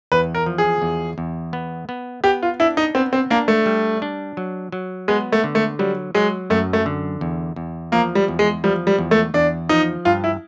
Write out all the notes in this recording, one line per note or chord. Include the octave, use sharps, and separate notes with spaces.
E2 B4
A#4
F3
G#4
E2
E2
B3
B3
B3 G4
F4
D4 E4
D#4
B3 C4
C4
A#3 D4
A3
G3
D4
F#3
F#3
G#3 B3
A3
D3
A3
F#3 G3
F#3 G#3
F#2 A3
A3
D3
E2
E2
F3 A#3
G3
E2
G#3
F3 G3
G3
E2
A3
E2 D4
F3 D#4
G2 F4
E4